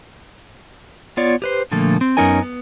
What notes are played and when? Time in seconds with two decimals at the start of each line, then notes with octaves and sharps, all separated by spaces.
1.17 B3 F4 C#5 D5
1.42 G4 B4 C5
1.72 A#2 D3 F3 A3 A#3
2.01 C4
2.17 F#2 B3 C#4 D#4 A#4 G#5
2.42 B3